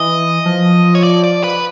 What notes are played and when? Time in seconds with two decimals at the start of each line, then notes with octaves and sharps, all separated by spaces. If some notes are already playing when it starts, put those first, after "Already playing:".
Already playing: E3 D#5
0.45 F3
0.95 C#5
1.03 D5
1.24 D5
1.44 B4